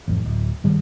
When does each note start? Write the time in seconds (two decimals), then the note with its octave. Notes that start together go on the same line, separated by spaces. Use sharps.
0.08 A1 F2
0.25 D1
0.64 G2 D#3 G3 G#3